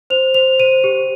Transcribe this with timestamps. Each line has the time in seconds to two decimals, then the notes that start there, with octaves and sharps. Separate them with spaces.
0.10 C5 F7
0.34 C5 F7
0.59 C5 D#7
0.84 G4